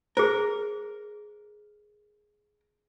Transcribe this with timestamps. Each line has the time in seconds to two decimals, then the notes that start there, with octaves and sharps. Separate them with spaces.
0.17 G#4 A#4 C5